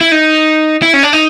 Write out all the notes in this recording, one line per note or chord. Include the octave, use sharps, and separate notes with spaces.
E4
D#4
E4
C#4
D4
D#4